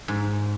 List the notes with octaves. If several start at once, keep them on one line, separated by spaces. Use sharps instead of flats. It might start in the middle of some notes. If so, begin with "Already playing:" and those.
G#2